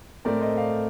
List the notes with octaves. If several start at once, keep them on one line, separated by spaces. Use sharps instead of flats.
A2 A3 C4 A#4 D5
C5 D#5
D5 F5